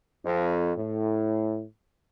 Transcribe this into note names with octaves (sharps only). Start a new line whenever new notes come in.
F2
A2